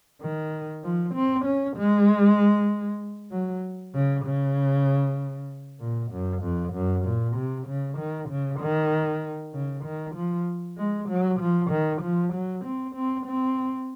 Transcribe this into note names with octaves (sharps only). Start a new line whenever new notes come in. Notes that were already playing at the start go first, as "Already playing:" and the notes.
D#3
F3
C4
C#4
G#3
F#3
C#3
C#3
A#2
F#2
F2
F#2
A#2
C3
C#3
D#3
C#3
D#3
C#3
D#3
F3
G#3
F#3
F3
D#3
F3
F#3
C4
C4
C4